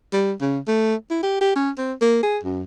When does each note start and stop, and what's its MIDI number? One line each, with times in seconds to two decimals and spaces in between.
0.13 0.33 55
0.41 0.59 49
0.68 0.95 57
1.11 1.20 64
1.23 1.40 67
1.41 1.53 67
1.56 1.70 61
1.78 1.93 60
2.01 2.22 58
2.23 2.38 68
2.43 2.64 42